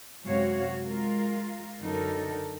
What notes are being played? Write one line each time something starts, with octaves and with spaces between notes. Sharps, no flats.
F#2 C3 G#3 F#4 C#5 F5
G#3 F4 A#4
F#2 D3 D#4 A4 A#4